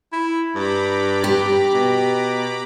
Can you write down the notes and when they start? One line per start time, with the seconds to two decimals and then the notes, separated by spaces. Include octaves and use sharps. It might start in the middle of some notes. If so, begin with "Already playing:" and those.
0.13 E4
0.55 G2 A#5 B5 D6
1.24 G4
1.74 B2